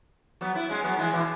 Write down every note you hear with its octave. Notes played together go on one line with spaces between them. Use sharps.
F#3 B3
B3 E4
G#3 C#4
F#3 B3
E3 G#3
B2 E3